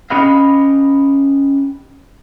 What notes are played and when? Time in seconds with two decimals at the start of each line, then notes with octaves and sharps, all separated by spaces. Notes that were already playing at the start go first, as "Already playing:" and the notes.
0.10 C#4 D#4 G4 B4 D#5 F5